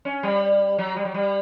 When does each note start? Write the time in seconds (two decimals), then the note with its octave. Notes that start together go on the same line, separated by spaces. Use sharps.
0.05 C#4
0.23 G3
0.78 F#3
0.96 G3
1.05 F#3
1.14 G3